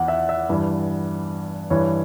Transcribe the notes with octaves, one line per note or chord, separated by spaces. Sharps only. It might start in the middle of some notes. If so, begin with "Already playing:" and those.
Already playing: E2 F#5
E5
E5
G2 E3
G2 E3 C#5